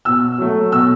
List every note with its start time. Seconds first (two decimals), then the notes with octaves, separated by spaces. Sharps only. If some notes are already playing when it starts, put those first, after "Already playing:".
0.05 B2 E6
0.38 F#3 A3
0.72 B2 E6